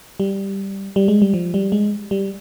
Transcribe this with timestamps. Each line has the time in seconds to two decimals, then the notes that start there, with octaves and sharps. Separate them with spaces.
0.20 G3
0.96 G3
1.08 G#3
1.22 G3
1.34 F3
1.54 G3
1.72 G#3
2.11 G3